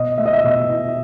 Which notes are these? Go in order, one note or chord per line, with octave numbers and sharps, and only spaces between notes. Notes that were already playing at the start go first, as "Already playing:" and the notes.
Already playing: B2 B3 D#5
A3 E5
D#5
E5
B2
E4